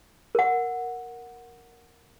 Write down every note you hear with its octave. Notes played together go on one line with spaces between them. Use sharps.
A#4 F#5